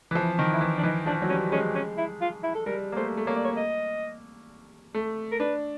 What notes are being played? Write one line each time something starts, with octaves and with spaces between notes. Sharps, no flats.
E3
F3
E4
D#3
E4
E3
D4
E3 D#4
F3 D4
F#3
G3 C#4
G#3 C#4
C#4
E4
F4
E4
A4
G3 A#4
A#3
A3 C5
A3
A#3 C#5
D5
C#5
D#5
A3
A#4
D4 B4